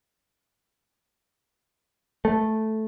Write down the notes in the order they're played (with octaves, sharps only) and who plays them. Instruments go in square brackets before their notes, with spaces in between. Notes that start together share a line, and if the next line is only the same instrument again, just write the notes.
[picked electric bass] A3